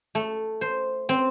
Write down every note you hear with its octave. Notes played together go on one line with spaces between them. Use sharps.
A3
C5
C4